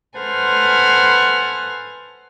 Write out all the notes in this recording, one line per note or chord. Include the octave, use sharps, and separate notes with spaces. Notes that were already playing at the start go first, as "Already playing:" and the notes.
A4 B4 C5 F#5 G#5 F6